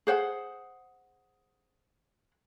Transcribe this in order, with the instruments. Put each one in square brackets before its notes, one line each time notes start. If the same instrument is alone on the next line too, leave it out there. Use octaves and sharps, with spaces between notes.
[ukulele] G#4 C5 F#5